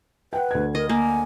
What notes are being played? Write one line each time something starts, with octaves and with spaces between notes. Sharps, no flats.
B4 F#5 G5
D2 G#6
A#4 D#5
A#3 G#5